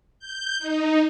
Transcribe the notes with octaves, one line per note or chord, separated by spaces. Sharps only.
G6
D#4